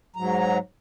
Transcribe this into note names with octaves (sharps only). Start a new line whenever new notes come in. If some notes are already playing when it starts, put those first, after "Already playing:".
G#2 F#3 A#5